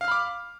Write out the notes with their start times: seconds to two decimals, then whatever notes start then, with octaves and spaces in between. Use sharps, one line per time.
0.01 F5
0.04 F6
0.08 B5
0.11 D6